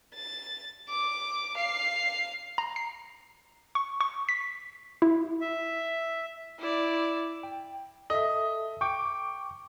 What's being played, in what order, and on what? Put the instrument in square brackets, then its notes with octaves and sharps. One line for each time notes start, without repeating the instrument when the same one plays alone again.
[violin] A6
D6
F5 C7
[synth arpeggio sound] A#5
C7
C#6
C#6
B6
E4
[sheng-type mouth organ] E5
[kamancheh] E4 D5
[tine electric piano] G5
[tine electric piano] A4 E5 [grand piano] D#5
[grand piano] G5 [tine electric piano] C#6 D6